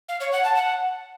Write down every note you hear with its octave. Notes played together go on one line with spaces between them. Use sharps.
F5
C#5
F#5
A5
F#5